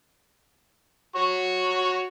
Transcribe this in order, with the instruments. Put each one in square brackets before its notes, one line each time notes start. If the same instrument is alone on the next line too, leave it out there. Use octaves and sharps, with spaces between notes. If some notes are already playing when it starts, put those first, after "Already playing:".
[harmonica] F#4 C#5 C#6